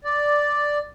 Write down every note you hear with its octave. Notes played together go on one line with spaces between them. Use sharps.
D5